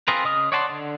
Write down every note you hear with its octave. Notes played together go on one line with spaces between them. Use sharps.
C4 F4 G#4 A#4 B4
C#3 D#5 D#6 F6
C#5 D5 F#5 A5 C6
D3